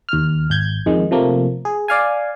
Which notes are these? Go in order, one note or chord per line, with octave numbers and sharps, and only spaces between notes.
D#2 F6
G#1 G6 G#6
F2 D#3 G#3
C3 F3 A3 A#3
G#4
D5 F5 G#5